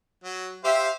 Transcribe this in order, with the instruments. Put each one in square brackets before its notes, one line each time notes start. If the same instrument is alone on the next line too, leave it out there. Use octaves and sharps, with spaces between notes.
[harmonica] F#3
[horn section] G4 E5 [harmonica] C5 F5